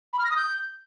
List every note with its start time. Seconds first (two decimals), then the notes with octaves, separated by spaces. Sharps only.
0.13 B5
0.19 F6
0.25 A#6
0.30 D#6
0.36 G6